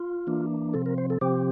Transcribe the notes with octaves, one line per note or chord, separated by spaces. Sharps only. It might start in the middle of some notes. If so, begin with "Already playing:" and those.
Already playing: F4
E3 A#3 D4
C3 F3 C4 A4
A#4
C5
A4
C3 F3 C4 G4